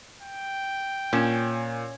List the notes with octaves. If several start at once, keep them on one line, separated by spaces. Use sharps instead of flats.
G5
A#2 C#4 E7